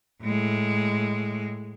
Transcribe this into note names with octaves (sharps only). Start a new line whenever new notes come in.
A2 G#3